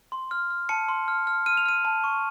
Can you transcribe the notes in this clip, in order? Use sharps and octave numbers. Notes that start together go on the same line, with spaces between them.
C6
F6
F6
A5 C#7
C6
F6
F6
F6 D#7
F7
F6 D#7
A5
C#6